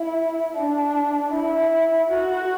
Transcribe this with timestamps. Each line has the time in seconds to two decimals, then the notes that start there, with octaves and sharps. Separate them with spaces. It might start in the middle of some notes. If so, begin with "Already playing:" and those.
Already playing: E4
0.54 D4
1.31 E4
2.10 F#4